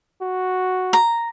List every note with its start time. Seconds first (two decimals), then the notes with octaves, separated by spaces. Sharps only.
0.22 F#4
0.93 A#5